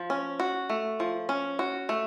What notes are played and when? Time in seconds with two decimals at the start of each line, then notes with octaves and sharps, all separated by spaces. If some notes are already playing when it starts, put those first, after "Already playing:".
Already playing: F3
0.10 C#4
0.40 F#4
0.69 A3
1.00 F3
1.29 C#4
1.59 F#4
1.89 A3